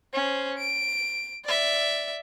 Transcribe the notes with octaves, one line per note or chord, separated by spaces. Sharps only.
C#4 C5
D7
D5 E5